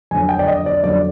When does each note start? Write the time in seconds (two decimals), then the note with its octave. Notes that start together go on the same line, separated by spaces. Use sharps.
0.11 F2 D3 F#3 G#5
0.29 G5
0.39 D5
0.47 D#5
0.66 D5
0.84 F2 D3 F#3 D5